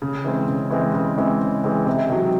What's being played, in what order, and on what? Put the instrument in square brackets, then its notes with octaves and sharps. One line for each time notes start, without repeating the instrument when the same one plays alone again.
[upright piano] C#3
E3 G#3 C4
C#3
E3 G#3 C4
C#3
E3 G#3 C4
C#3
E3 G#3 C4
C3
D#3 F#3